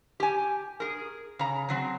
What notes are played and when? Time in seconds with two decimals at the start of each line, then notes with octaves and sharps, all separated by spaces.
0.20 G4 G#5
0.80 G#4 A#4
1.39 C#3 A#5
1.68 C#3 F#3 C4